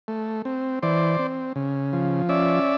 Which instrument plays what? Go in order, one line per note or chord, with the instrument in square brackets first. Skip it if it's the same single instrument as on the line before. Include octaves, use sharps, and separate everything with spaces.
[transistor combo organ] A3
C4
E3 C5 D5
C4
C#3
F3
C#4 D5 E5